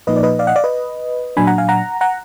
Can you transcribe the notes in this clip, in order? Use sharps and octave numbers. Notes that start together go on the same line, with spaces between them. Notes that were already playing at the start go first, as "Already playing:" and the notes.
A#2 F3 A#3 D#4 B4 D#5
D5
B4 D#5
D5 F5
D#5 F#5
D5 F5
B4 D#5
A#2 F#3 D4 G#5 B5
F#5 A#5
F5 G#5
F#5 A#5
F#5 A#5